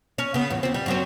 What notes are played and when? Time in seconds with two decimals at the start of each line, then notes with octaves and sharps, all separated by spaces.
0.18 C#4
0.34 C#3 B3
0.50 E2 A2
0.63 D#2 C4
0.74 G3
0.86 F#2 F#3 C4